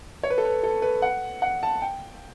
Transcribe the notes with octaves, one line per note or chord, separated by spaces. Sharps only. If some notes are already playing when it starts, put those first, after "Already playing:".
C#5
B4
A4
B4
A4
B4
F#5
F#5
A5
G5